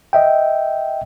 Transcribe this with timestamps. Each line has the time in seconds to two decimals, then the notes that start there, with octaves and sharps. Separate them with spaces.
0.13 D#5 E5 G5